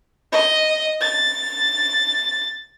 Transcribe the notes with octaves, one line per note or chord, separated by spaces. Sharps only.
D#5
A6